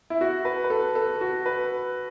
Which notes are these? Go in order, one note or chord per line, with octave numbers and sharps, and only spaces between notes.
E4
F#4
B4
B4
A4
A4
F#4
B4